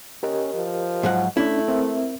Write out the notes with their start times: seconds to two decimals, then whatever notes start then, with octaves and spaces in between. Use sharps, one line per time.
0.23 C#4 G4 A#4 D#5
0.55 F3
1.03 G#2 F#3 F#5
1.37 A3 C#4 D4 E4
1.68 C4 A#4 E5